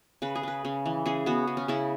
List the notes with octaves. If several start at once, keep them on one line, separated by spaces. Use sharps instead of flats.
C#3 B4
G#4
C#3 B4
C#3
E3
C#3 G#4
B3 F#4
C#3
C#4
C#3 E4